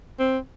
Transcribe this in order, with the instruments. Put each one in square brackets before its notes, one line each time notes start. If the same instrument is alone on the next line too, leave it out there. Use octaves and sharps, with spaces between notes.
[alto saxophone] C4